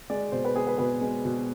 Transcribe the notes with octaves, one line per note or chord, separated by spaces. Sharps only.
G#3 D5
B2 C5
B4
G#3 G#4
B4
B2 B4
G#3
B2